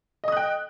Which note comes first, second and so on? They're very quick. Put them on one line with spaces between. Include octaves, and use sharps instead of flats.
D#5 D#6 F#6 G5